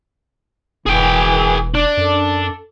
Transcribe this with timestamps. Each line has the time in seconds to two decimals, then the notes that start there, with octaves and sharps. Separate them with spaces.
0.86 E1 E3 G#4 G5
1.74 D4
1.97 F#2 A4